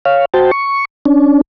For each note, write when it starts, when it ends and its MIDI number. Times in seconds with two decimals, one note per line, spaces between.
0.05 0.25 73
0.05 0.25 77
0.34 0.51 66
0.34 0.51 72
0.34 0.51 79
0.34 0.51 81
0.51 0.85 85
1.06 1.41 61
1.06 1.41 62